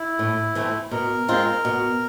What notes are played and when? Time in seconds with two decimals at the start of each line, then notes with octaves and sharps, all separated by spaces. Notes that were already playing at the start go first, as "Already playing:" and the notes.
Already playing: E4
0.19 A2
0.55 E3 A3 C4
0.91 B2 A#4
1.28 G#3 C4 F4
1.65 B2